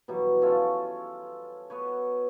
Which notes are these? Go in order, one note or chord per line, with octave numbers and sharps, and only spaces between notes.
B2 E3 F#3 G3
C#4 F4 A4 C#5
B3 F#4 B4 C#5